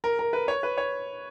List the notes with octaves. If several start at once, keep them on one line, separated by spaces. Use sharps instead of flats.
A#4
A#4
B4
C#5
B4
C#5